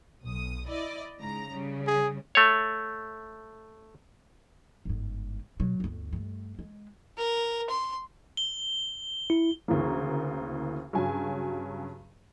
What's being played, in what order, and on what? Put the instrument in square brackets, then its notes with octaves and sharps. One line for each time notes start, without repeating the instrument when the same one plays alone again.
[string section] B1 D#6
E4 D5 D#5
G#2 C#3 A#5
C#3 G3
[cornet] G#4
[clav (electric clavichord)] A3 C#5
[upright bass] G1 G#2
B2 F#3
G1 D2
G2 A3
G#3
[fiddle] A#4
C6
[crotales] G7
[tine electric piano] E4
[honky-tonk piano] D2 C#3 E3 A#3
G2 C#3 F#3 G#5